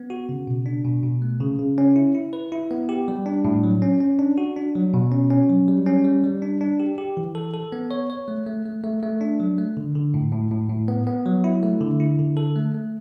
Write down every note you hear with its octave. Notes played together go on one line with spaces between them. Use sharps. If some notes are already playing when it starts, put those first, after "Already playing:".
Already playing: B3
F#4
C#3
B2
D4
B2
B2
A3
C#3
C#3
C#4
E4
E4
B4
E4
B3
G4
G3
D4
A2
F#3
C#4
C#4
D4
F#4
D4
F#3
B2
C#4
C#4
F#3
G3
C#4
G3
G3
D4
D4
G4
G4
E3
A4
A4
B3
C#5
C#5
A3
A3
A3
A3
A3
D4
F#3
A3
D3
D3
A2
A2
A2
A2
B3
B3
F#3
E4
A3
D3
E4
D3
A4
A3
A3